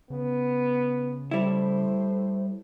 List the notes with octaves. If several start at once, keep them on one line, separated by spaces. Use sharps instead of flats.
C#3 B3
A2 G3 E4 C5